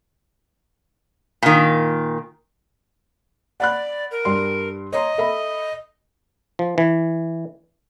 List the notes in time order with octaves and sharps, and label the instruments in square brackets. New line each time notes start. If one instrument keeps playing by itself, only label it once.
[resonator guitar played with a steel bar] A#2 D#3
[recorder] D5 [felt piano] F#5 B5 F#6
[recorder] A#4
[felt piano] G2 G3 C6
[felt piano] C#5 A#5 C6 [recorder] D#5
[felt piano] A4 E5 B5
[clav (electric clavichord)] F3
E3